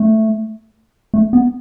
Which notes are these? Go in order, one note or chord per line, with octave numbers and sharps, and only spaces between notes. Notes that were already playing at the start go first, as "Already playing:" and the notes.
Already playing: A3
A3
B3